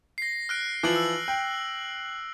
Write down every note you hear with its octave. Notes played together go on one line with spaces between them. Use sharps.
A#6 C7
F6 F#6 D7
E3 F3 F#6 D7 F#7
E6
G5